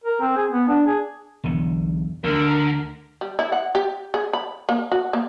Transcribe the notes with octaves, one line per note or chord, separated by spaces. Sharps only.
A#4
C4
G#4
B3
D4
G#4
B1 E2 D3
D2 D3 A#4
G3
E4
F#5
G4
G#4
B5
A#3
F#4
A#3